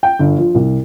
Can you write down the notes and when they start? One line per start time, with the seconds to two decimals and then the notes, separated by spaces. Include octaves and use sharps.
0.03 G5
0.19 G1
0.38 F3
0.55 C2